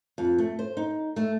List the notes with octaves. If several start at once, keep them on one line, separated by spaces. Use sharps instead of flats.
F2
A3
C5
D#4
A3